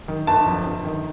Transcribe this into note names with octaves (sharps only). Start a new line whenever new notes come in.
D#3
G1 A5
F2
G1
D#3